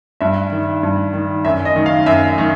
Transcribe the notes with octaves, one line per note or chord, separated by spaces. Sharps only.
G2 E5
D#3
G2
D#3
F#2 E5
D#5
D#3
F5
F#2 E5
D#3